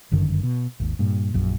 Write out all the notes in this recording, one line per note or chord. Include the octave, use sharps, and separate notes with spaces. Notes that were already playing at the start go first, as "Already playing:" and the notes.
G1 F#2 D3 D#3
B2
G#1 D#2
G2 A#2
A#1 F#2